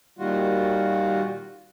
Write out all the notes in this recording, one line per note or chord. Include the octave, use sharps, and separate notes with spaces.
A#2 D#3 G3 F4 F#4